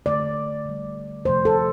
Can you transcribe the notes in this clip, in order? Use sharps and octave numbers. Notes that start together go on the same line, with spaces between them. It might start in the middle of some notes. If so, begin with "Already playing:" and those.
D3 A3 D5
D3 G3
C3 F3 A3 C5
A4